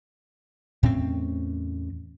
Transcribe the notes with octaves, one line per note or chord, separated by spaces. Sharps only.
E2 A2 C4 C#4